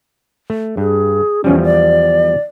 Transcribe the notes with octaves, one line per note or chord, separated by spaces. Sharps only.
A3
G2 G#4
E2 F3 G3 C#4
D5